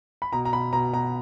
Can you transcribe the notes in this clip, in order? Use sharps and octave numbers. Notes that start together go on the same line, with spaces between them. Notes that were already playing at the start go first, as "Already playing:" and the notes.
B5
B2 A#5
A#5
B2 B5
B2 A#5
B2 A#5